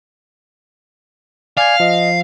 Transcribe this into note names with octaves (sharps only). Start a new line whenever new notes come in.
D5 F5 G#5 G#6
F3 D#5